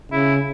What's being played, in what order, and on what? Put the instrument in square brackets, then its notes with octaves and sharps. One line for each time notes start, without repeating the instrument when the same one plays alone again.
[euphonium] C#3 [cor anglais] E4